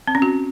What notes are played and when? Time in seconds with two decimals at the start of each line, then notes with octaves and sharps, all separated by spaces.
0.07 C4
0.15 C#4
0.22 F#4